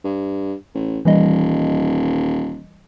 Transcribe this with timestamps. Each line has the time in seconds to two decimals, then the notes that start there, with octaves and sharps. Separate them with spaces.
0.04 G2
0.74 A1
1.05 D#1 E3 G3 D#5